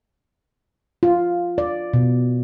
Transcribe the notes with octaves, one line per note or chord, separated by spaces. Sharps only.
F4
D5
B2